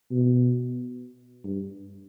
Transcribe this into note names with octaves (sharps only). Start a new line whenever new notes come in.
B2
G2